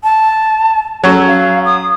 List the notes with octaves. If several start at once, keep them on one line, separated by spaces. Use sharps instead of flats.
A5
F#3 C#4 A4
F5
D#6